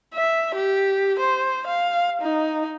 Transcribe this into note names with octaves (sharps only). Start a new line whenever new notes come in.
E5
G4
C5
F5
D#4